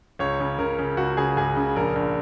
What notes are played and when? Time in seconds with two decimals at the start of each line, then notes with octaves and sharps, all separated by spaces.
0.19 C#2 C#5
0.40 C#3
0.58 C#3 A#4
0.79 C#3
0.97 C#2 F#4
1.17 C#3 G#4
1.37 C#2 G#4
1.56 C#3
1.76 A#1 A#4
1.96 A#1